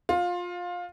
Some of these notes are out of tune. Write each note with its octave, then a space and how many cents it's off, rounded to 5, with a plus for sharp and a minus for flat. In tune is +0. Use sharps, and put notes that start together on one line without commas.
F4 +20